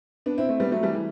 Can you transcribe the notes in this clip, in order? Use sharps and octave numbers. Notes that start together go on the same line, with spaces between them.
B3 D4
C4 E4
A3 C4
G3 B3
F#3 A3
E3 G3
E3